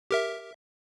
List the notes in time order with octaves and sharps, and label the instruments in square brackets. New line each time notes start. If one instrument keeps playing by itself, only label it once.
[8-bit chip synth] G4 A#4 E5